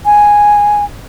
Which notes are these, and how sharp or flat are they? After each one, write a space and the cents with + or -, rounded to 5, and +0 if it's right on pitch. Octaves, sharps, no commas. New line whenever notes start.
G#5 -5